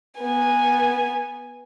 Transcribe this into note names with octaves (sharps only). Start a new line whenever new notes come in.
B3 G#5